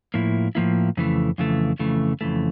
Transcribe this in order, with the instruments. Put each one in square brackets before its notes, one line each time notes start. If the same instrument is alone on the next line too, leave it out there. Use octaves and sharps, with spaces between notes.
[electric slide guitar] A2 F3 A#3 E4
A2 F3 A#3 E4
F2 C#3 E3 A3
F2 C#3 E3 A3
F2 C#3 E3 A3
F2 C#3 E3 A3